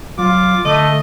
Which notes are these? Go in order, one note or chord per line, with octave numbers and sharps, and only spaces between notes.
F#3 F4 D6
D3 A3 D#5